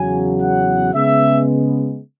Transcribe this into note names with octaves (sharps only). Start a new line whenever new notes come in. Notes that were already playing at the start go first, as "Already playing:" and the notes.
Already playing: E2 C#3 F#3 G#5
F#5
C#3 G#3 B3 E5